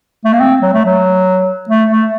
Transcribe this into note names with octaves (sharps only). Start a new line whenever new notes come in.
A3
A#3
C4
F#3
A3
F#3
A3
A3